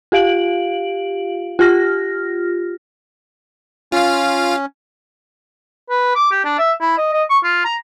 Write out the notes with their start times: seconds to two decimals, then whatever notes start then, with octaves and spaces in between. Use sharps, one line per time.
0.12 F4 G4 F5 D7 F#7
1.59 F4 G4 F6 A#6
3.92 C#4 F4 F5
5.90 B4
6.15 D6
6.31 G4
6.45 D4
6.58 E5
6.81 E4
6.97 D#5
7.13 D#5
7.30 C#6
7.44 F4
7.65 A#5